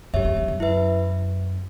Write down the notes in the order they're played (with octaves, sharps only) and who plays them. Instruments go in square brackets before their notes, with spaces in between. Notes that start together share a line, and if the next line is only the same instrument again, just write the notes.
[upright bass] F#2 [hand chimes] G4 C#5 E5
[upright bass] E2
F#2
F#2
[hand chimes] E4 B4 E5